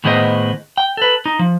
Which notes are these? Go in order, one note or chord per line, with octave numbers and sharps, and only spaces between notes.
A2 D#3 B3 G#4 C5 D#5
G5
A4 B4
D#4
F3